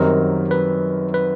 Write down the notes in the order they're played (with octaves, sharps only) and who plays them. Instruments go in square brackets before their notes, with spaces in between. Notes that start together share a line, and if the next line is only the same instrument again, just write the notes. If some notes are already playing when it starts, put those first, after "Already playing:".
Already playing: [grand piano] F#2 D#3 G3 C4 D#4 [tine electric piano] A#4
[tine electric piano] B4
B4